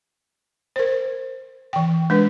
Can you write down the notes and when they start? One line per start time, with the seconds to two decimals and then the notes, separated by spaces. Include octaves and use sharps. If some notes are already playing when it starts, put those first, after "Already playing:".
0.76 A#4 C5
1.73 E3 G5
2.10 G#3 D4 B4